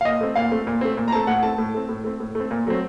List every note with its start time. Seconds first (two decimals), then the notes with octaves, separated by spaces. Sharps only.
0.01 F5
0.05 A#2 D#5
0.21 A3 C4
0.35 A#2 F5
0.51 A3 C4
0.67 A#2
0.81 A3 C4
0.97 A#2
1.08 A#5
1.12 A3 C4 A5
1.27 A2 F#5
1.43 A3 C4 A5
1.58 A2
1.74 A3 C4
1.89 A2
2.04 A3 C4
2.20 A2
2.35 A3 C4
2.51 A#2
2.67 F#3 A3 C4